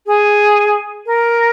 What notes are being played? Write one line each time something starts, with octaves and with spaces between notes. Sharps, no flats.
G#4
A#4